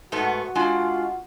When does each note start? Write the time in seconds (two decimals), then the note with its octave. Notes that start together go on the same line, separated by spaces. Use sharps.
0.12 G#2 A3 B3 F#4
0.55 G#3 D4 F4 G#5